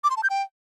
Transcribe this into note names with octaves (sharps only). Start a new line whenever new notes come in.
D6
C6
A5
G6
G5